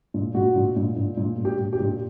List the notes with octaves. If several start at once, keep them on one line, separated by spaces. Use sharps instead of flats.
A#2
A#2 F#4
A#2
A#2
A#2
A#2
A#2
G4
A#2
G4
A#2
G4